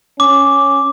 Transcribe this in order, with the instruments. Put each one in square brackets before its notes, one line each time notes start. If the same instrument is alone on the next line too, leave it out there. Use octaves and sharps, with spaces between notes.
[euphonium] C#4 [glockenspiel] D6